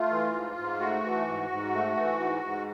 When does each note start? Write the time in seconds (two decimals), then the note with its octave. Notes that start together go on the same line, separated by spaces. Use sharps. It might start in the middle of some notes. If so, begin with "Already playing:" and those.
Already playing: A3 F4
0.10 E3
0.34 G#2
0.57 G#2
0.80 A3 F#4
1.04 E3
1.28 G#2
1.50 G#2
1.74 A3
1.97 E3
2.20 G#2
2.44 G#2